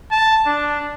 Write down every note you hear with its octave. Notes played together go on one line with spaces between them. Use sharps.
A5
D4